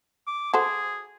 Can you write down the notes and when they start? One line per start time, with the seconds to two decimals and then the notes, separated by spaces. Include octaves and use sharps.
0.27 D6
0.54 F#4 G#4 A4 C5